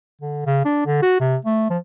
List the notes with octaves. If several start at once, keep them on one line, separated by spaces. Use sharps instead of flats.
D3
C#3
D4
D3
F#4
C3
A3
F3